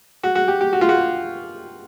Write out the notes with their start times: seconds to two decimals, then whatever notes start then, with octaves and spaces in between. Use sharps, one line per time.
0.23 F#4
0.35 F#4
0.48 G4
0.61 G4
0.73 F#4
0.81 F4
0.89 F#4